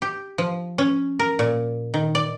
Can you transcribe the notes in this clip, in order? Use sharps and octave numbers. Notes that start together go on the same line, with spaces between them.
G4
F3
C#4
A#4
A#2
D#3
D5